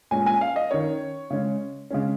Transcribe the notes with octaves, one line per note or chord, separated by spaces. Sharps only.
A#2 G#3 C#4 G#5
G#5
F5
D#5
D#3 C#4 C#5
C#3 G#3 C#4
C#3 G#3 C#4